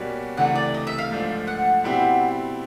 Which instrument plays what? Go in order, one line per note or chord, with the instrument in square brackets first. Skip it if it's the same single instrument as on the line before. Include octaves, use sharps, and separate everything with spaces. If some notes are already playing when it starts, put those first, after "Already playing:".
Already playing: [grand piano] B2 G3 A#3 C#4 F#4
[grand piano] C#2 C3 E3 A3 D4 [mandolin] F#5
[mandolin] D5
D#5
E5
F5
[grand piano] G#2 F3 A3 D4
[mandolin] F#5
[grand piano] B2 G3 C4 E4 G4